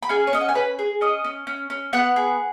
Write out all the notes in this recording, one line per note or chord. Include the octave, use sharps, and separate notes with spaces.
B5
C#4 G#4 G#5
C#5
C#4 D#5
F#5
G#5
C#4 B4 B5
G#4
C#4 D#5 D#6
C#4
C#4
C#4
B3 F#5 F#6
G#4